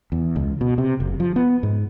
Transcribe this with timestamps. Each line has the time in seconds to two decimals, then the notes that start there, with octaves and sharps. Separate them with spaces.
0.12 E2
0.36 C#2
0.61 B2
0.78 C3
1.00 F#1
1.20 F3
1.36 B3
1.63 G#2